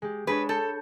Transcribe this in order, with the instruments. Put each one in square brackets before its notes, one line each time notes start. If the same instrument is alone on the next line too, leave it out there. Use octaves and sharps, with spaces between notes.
[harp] G#3 G4
[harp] G#3 D4 C#5 [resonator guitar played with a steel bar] B4
[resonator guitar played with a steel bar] A4 [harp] G6 C#7